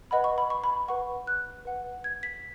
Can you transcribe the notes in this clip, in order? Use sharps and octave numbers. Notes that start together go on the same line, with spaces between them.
B4 D#5 F#5 B5
C#6
B5
C#6
B5
B4 F#5 C#6
F#6
B4 F#5
G#6
B6